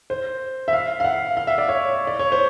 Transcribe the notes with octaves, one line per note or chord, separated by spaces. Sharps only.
C5
E5
F5
F5
F#5
F5
E5
D5
C#5
D5
C#5
C5